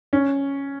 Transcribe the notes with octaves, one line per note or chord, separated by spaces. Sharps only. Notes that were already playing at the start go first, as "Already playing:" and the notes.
C#4